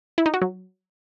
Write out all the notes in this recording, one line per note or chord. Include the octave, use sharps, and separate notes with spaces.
E4
D#4
F#4
F#3